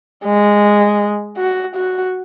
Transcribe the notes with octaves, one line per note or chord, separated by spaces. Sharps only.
G#3
F#4
F#4